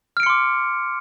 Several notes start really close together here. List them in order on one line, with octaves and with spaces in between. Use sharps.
F6 D7 C#7 C6 D6